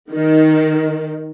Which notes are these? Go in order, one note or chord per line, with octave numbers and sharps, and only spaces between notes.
D#3